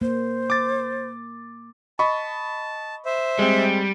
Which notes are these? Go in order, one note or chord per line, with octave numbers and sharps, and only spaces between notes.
A#3 C5
D6 A6
D#5 A5 B5 C#6
C5 E5
G3 G#3 C4